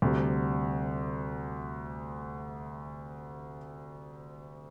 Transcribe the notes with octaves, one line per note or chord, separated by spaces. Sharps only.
D2 C3 G3